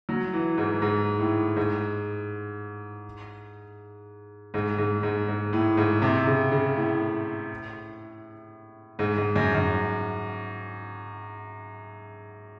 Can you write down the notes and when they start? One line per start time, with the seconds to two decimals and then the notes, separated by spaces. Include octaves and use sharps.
0.09 F#3
0.33 E3
0.58 G#2
0.82 G#2
1.19 A2
1.56 G#2
4.54 G#2
4.78 G#2
5.03 G#2
5.28 G#2
5.53 A2
5.77 G#2
6.02 C3
6.26 C#3
6.51 C#3
6.76 A2
8.99 G#2
9.17 G#2
9.36 F#2
9.55 F#2